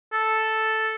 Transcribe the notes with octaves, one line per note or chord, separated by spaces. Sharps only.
A4